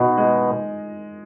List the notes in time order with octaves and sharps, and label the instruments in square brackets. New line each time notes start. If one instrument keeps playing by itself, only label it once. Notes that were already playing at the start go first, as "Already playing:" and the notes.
Already playing: [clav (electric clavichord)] B2 [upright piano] D#4
[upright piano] G#3